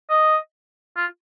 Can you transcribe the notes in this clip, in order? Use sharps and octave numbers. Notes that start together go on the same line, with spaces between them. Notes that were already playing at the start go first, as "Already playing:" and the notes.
D#5
F4